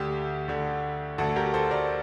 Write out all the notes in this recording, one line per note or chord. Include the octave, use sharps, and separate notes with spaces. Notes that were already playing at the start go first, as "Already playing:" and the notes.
Already playing: D2 D3 G4
D2 D3
D2 D3 F#4 A4
G4 A#4
A4 C5
A#4 D5